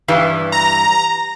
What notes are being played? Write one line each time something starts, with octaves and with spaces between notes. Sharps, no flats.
G2 E3 G3
A#5